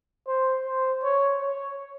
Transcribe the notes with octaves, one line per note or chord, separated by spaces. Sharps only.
C5
C5
C#5
C#5